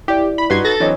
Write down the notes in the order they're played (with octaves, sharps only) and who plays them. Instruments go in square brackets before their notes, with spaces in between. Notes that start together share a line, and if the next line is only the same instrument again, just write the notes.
[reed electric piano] E4 D5 [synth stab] G4
[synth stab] B5
[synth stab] G2 C6 G#6 [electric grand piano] D#4 F#4 B4
[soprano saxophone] A4 [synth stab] A6 A#6
[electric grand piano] E3 F#3 C4 [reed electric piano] D4 C#5 D#5